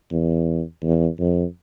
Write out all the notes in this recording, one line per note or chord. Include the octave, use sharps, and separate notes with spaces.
E2
E2
F2